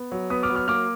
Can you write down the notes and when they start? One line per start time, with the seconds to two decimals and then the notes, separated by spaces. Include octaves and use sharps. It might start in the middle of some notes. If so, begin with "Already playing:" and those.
Already playing: B3
0.12 F#3
0.30 B3 B5 D#6
0.43 D6 F6
0.50 F#3
0.55 D6 F6
0.68 A#3 D6 F6